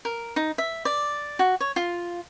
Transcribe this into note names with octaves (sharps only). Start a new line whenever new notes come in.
A#4
D#4
E5
D5
F#4
C#5
F4